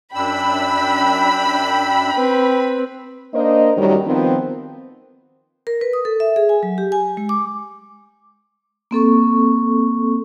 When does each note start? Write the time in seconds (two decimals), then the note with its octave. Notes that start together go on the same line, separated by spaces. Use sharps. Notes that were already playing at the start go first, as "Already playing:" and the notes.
0.15 F#2 D4 G5 B5 E6
2.14 C4 B4
3.34 A#3 D4 A#4 C5 D#5
3.77 F#2 A2 D#3 F#3 G3
4.07 D#3 F3 B3 C4
5.67 A#4
5.81 B4
5.93 D#6
6.05 A4
6.20 E5
6.36 G#4
6.49 G#5
6.63 F#3
6.78 G4
6.92 G#5
7.17 G#3
7.29 D6
8.91 A#3 C4 A4 C#6